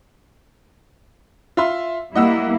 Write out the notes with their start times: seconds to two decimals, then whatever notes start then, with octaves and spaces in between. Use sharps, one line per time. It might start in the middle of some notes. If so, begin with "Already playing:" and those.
1.57 F4 E5 C6
2.16 G3 A#3 E4 D#5 F#5 E6